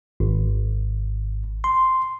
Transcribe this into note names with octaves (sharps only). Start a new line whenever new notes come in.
G#1
C6